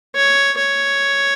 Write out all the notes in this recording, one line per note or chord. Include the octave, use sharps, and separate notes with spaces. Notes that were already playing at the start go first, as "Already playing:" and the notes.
C#5
C#5